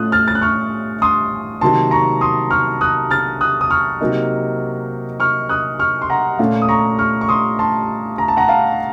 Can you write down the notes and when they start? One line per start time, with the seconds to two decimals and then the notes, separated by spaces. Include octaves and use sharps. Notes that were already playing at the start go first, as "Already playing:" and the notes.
Already playing: A2 A3 C#4 F4 D#6 F#6
0.12 F6 A6
0.28 A6
0.35 F#6
0.42 C#6 F6
1.02 C6 D#6
1.61 C3 D#3 F#3 A#3 A5 C6
1.91 A#5 C#6
2.21 C6 D#6
2.51 C#6 F6
2.81 D#6 F#6
3.10 F6 A6
3.41 D#6 F#6
3.61 D#6
3.71 C#6 F6
4.01 C3 F#3 A#3 D#4
5.20 C#6 F6
5.49 D#6 F#6
5.79 C#6 F6
6.02 C6
6.10 F#5 A#5
6.39 A#2 A3 C#4 F4 F5
6.62 D#6
6.69 A#5 C#6
6.99 C#6 F6
7.21 C#6
7.29 C6 D#6
7.59 A5 C6
8.18 A#5
8.28 A5
8.37 F#5 A#5
8.48 F5 A5